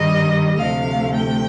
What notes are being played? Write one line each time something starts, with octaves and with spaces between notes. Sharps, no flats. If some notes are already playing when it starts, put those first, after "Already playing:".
Already playing: G2 D#3 G3 D#5
D2 C3 F3 A3 F5
G5